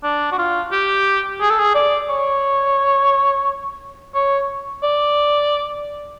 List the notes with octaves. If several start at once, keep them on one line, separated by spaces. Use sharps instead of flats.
D4
F#4
F4
G4
G#4
A4
G#4
D5
C#5
C#5
D5